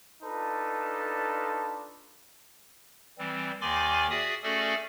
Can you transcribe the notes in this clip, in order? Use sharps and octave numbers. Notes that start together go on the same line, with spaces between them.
D4 D#4 F4 A4 B4 A5
E3 G3 C4
D#2 D#3 D5 G#5 C6 D6
F#4 G#4 D5 E5 D#6
A3 C#4 F#4 G#4 A4 D5